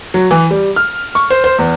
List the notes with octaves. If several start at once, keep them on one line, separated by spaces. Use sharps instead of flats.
F#3
E3
G3
F6
C#6
C5
C5
E2